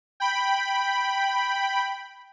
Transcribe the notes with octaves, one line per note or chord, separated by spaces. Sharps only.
G5 B5